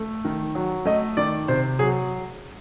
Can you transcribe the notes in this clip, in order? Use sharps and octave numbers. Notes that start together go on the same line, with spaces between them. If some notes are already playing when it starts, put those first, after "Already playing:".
Already playing: A3
D#3
F#3
A3 D#5
D#3 D5
C3 C5
F#3 G#4